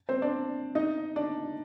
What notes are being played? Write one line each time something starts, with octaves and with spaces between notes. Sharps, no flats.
C4 C5
D4 D5
D#4 D#5
D4 D5